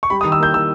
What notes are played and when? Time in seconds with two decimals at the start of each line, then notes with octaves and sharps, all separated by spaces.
0.03 C#6
0.10 G3 B5
0.21 D#6
0.25 D#3
0.32 E6
0.40 A#3 G6
0.54 D#3 E6